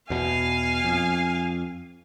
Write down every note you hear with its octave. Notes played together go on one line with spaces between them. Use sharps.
E2 B2 F5 G#5
F2